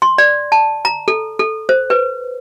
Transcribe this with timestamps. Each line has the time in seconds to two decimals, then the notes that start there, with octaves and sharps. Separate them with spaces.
0.02 C6
0.18 D5
0.52 A5
0.85 A#5
1.08 A4
1.39 A4
1.69 C5
1.90 B4